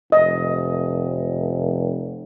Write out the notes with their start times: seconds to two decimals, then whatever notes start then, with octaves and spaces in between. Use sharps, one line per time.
0.12 F1 D#5